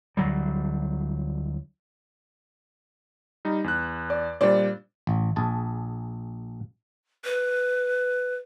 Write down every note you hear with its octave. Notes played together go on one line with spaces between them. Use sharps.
D2 F#3 G3
G3 D#4
E2 F#6
D5
A#2 G3 D4 C5 D5
A1
A#1 G#4 A5
B4